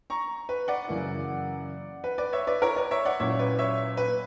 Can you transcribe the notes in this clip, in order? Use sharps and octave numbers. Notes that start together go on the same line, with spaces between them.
A#5 C#6
B4
D5 F#5
F#2 C#3 E3 A#3 E4
B4
B4 D5
C#5 E5
B4 D5
A#4 C#5
B4 D5
C#5 E5
D5 F#5
A#2 F#3 C#4 E4 C#5 E5
B4 D5
C#5 E5
B4